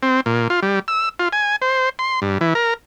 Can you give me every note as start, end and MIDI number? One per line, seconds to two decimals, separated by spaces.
0.03 0.21 60
0.26 0.48 46
0.50 0.60 65
0.63 0.79 55
0.88 1.09 88
1.20 1.29 65
1.33 1.56 80
1.62 1.89 72
1.99 2.20 84
2.22 2.38 43
2.41 2.54 52
2.55 2.74 70